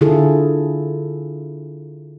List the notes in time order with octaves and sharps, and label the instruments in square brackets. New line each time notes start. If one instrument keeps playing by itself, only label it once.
[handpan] D3 E4 F4 G#4 A4